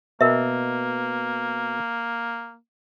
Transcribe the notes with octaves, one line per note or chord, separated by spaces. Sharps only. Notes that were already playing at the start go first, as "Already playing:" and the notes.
B2 A#3 A#4 E5